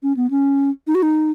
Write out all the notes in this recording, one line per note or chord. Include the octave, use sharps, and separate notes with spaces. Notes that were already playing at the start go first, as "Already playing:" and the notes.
C#4
B3
C#4
D#4
F#4
D#4